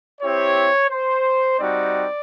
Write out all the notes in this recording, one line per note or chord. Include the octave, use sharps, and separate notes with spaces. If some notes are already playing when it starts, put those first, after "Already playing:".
C4 E4 G4 C#5
C5
G3 C4 D#4 F#4 D5